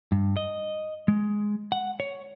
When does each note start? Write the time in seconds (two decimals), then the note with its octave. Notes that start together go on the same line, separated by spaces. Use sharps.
0.12 G2
0.37 D#5
1.08 G#3
1.72 F#5
2.00 C#5